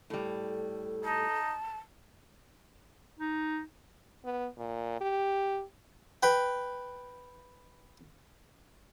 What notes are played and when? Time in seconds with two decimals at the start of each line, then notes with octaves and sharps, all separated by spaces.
0.10 A2 G3 A4
1.05 D#4 A5
3.19 D#4
4.25 B3
4.58 A#2
5.01 G4
6.23 B4 G5